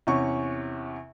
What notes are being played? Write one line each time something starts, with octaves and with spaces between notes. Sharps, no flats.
E2 C3 C#4 C#6